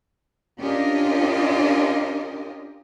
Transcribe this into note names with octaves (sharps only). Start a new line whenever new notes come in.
C#4 D4 F4 G4 A#4 D#5